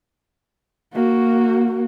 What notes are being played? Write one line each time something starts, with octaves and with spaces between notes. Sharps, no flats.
A#3 F#4